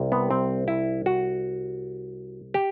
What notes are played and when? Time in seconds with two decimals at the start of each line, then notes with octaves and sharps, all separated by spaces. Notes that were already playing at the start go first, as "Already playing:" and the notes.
Already playing: C2 C3 G3
0.12 B3
0.31 C4
0.68 E4
1.06 F#4
2.54 G4